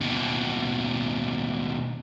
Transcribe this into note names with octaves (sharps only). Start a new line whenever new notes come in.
D#2 B2